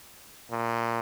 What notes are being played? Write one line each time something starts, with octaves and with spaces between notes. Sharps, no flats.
A#2